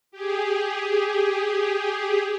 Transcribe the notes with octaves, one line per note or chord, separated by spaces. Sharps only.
G4 G#4